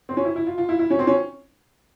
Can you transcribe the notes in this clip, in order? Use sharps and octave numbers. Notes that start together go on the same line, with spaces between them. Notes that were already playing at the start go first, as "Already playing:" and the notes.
C4
C#4
E4
E4
F4
F4
E4
E4
C#4
C4
C#4